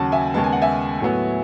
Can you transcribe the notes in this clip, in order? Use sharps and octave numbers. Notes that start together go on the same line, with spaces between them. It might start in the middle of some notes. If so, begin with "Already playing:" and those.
Already playing: D#2 C#3 F#3 F#5 A5
E5 G#5
D#2 C#3 G#3 B3 A5
G#5
F#5
E5 G#5
A2 F#3 B3